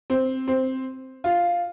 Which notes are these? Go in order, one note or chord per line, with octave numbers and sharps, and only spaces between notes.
C4
C4
F4